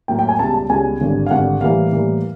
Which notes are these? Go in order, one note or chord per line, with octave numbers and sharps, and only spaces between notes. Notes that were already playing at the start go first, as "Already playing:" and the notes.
A2 F#3 A#3 G5
G5
G#5
C#2 B2 G3 A5
A5
C#2 B2 G3 G#5
G#1 G2 D3
F5
G#1 G2 D3 F#5
A2 E3 G3 A#3 F5
A2 E3 G3 A#3